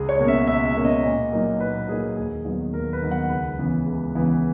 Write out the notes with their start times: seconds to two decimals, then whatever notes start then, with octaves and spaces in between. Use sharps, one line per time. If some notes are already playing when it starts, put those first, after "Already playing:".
Already playing: C#2 G#4
0.09 C#5
0.19 B2 A#3 C#4
0.28 E5
0.47 C#2 E5
0.66 E5
0.75 B2 A#3 C#4
0.85 D#5
1.03 A#2
1.32 F#3 A#3 D#4
1.60 A#2 B4
1.88 F#3 A#3 D#4 G#4
2.16 D#2 G#4
2.44 D#3 F#3 B3 D#4
2.73 D#2 A#4
2.93 B4
3.02 D#3 F#3 B3 D#4
3.11 F#5
3.30 C#2 B4
3.58 C#3 E3 B3
3.86 C#2
4.15 C#3 E3 B3